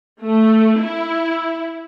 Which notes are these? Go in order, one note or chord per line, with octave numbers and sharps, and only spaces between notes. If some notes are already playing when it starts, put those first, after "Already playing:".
A3
E4